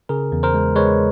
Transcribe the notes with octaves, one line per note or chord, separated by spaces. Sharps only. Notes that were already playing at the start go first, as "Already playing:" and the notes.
C#3 G#4 A#4
E2
A#4 C5
G#3
G#3 B4 C#5